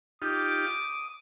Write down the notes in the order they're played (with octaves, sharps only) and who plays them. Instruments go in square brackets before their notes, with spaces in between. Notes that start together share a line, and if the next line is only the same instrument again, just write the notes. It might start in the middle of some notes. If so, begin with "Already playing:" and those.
[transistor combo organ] D#4 F4 G4 [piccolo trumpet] D6
[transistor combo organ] D#6